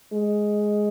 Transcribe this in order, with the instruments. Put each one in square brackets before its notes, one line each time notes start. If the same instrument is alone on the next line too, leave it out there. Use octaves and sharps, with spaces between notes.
[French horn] G#3